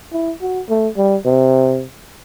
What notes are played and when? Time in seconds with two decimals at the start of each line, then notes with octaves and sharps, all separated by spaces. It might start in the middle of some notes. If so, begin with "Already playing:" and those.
0.12 E4
0.41 F#4
0.69 A3
0.97 G3
1.25 C3